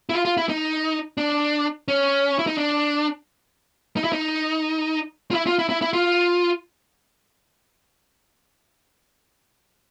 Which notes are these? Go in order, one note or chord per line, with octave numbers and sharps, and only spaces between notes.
E4
F4
F4
E4
D#4
D4
C#4
E4
D#4
D4
D#4
E4
D#4
F4
E4
F4
E4
E4
E4
F4